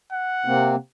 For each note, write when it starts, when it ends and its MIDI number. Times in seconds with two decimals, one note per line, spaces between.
0.12 0.79 78
0.45 0.76 48
0.45 0.76 58
0.45 0.76 60